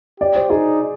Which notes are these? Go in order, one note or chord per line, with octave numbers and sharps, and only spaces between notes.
G4 D5
C5
D#4 G#4